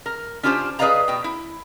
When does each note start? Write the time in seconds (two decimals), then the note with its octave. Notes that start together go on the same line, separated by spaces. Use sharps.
0.06 A#4
0.43 C#4 D4 F4 G4 A#4 C5
0.79 G#4 B4 D5 D#5 F5 A#5
1.08 B2 G5
1.24 E4